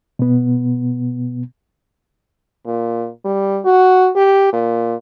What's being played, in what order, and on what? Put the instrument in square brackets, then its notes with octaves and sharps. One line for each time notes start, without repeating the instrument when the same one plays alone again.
[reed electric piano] B2 B3
[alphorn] A#2
G3
F#4
G4
A#2